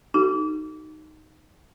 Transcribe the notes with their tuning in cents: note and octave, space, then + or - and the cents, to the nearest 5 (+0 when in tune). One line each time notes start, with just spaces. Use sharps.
D#4 +0 F#4 +35 A4 +0